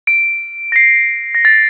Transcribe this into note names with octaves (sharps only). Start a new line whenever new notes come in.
D7
A#6
C7
A#6
A6